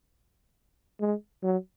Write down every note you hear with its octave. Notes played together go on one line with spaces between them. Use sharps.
G#3
F#3